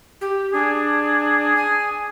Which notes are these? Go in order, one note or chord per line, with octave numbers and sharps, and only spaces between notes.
G4
D4 G#4
G#5